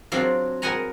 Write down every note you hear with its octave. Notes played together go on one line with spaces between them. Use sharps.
F#3 C4 D4 F4
A#4 B4 D#5 F#5 G#5 A#5